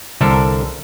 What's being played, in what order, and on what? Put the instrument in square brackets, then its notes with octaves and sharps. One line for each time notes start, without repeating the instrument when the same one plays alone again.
[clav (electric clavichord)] C2 D3 D4 A4 A#4